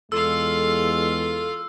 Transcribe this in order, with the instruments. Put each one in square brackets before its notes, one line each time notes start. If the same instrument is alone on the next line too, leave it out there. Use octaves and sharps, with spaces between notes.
[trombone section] E2 G#3 [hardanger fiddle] F4 F5 [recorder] A4 [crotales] E6